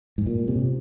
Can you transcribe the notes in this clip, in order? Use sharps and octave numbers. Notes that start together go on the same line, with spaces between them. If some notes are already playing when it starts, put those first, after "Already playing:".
G#2
A#2
C3